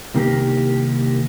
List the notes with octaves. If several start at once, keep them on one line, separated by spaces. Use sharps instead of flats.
C2 D#3 A#3 G4